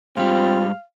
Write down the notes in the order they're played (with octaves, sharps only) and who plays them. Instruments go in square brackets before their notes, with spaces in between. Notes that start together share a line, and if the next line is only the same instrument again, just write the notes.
[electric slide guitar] G#2 G3 [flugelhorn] C4 [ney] F4 [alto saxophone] F5